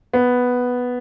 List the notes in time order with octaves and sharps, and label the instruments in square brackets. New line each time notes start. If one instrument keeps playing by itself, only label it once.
[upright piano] B3